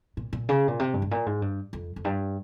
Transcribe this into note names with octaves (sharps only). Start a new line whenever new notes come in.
A#2
A#2
C#3
A#2
C3
G2
G#2
A#2
G#2
G2
F2
F2
G2